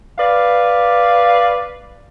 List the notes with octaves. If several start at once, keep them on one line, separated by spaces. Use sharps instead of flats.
B4 D5 F5